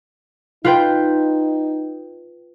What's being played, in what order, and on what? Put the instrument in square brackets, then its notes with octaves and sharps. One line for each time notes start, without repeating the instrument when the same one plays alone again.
[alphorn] D#4 [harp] F4 B4 G5